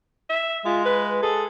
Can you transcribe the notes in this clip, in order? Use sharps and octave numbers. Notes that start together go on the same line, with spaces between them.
E5
G#3 F4
B4
G#4 A4